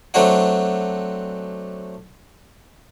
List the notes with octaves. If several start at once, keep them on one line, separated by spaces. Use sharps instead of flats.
F#3 A3 C4 D4 F#4 F#5